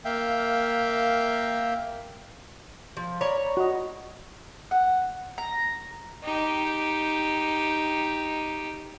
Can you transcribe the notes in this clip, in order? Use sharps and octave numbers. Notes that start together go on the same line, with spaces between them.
A#3 E5 F5 G5
F3
C#5 D5 A#5 B5
F#4 D#5
F#5
A#5
D#4 G4